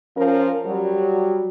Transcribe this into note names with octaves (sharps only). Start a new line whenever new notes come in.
F3 C#4 F4 A#4
F#3 G3